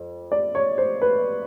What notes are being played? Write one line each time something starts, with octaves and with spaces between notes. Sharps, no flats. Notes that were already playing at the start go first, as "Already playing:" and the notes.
Already playing: F2
D5
C#5
C5
B4